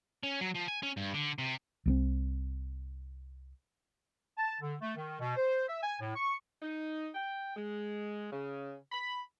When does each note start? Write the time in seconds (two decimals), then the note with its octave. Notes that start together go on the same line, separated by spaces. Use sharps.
0.23 C#4
0.41 F#3
0.55 F3
0.68 G#5
0.83 C#4
0.97 G2
1.14 D3
1.38 C3
1.86 C2 G3 C4
4.38 A5
4.61 D3
4.81 A3
4.97 D#3
5.20 B2
5.36 C5
5.68 E5
5.83 G#5
6.01 A2
6.16 C#6
6.62 D#4
7.14 G5
7.56 G#3
8.32 C#3
8.92 B5